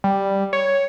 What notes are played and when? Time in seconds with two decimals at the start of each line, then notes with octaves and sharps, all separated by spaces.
0.04 G3
0.53 C#5